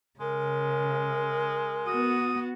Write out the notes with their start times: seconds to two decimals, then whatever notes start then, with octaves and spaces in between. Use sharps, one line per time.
0.20 C#3 G#3 A#4
1.87 B3 F#4 D#6